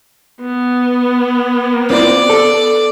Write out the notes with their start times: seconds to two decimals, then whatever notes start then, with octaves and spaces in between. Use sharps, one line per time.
0.41 B3
1.90 C4 E4 F4 D5
2.30 A4